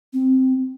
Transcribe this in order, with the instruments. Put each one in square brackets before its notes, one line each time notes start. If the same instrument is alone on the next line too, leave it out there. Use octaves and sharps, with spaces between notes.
[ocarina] C4